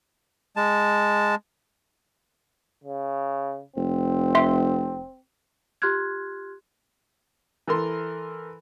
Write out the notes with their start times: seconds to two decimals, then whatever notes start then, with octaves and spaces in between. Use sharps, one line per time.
0.56 G#3 A5
2.84 C#3
3.76 F1 C4
4.35 E5 C6
5.82 F4 G4 C6 F6 F#6 G#6
7.67 E3 A4 A#4 C6